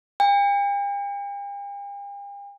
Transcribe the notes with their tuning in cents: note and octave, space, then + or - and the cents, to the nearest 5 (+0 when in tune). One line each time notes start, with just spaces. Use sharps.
G5 +45